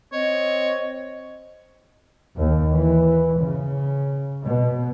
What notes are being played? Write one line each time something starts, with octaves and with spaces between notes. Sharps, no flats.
C4 C#5 D#5
D#2
E3
C#3
B2